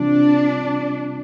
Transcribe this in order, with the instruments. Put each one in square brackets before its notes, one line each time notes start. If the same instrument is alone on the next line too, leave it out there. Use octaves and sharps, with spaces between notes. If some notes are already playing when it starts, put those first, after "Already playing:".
Already playing: [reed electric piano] C3 E3 G3 C4 F4 [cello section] D4